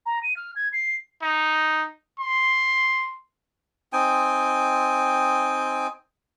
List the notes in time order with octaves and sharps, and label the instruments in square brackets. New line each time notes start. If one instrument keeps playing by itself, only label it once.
[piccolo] A#5
D#7
F6
G#6
C7
[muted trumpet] D#4
C6
[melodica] C4 D#4 G5 G#5